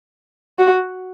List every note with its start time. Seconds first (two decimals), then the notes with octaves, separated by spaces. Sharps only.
0.59 F#4